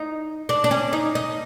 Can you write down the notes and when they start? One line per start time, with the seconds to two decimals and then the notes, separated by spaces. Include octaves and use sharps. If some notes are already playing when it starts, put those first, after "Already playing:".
Already playing: D#4
0.49 D4
0.64 D4
0.71 C#4
0.93 D#4
1.15 D#4